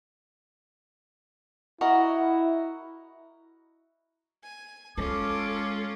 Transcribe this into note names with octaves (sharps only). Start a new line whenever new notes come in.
E4 F#4 A#4 D#5
G#5
G#3 C#4 F4 A4 D6